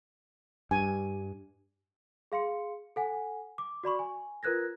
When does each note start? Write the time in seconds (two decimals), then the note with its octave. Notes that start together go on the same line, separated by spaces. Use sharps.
0.71 G2 G#5
2.32 G#4 F5 C6 C#7
2.96 A4 F#5 G#5
3.58 D6
3.84 F#4 D5 B5 C#6
3.99 G#5
4.43 F4 A#4 B4 F#6 G#6 A#6